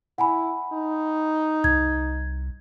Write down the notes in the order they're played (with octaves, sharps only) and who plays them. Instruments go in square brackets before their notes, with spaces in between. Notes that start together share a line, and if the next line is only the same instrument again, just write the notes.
[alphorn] E4 [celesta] F#5 G#5 B5
[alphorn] D#4
[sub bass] C2 [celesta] G#6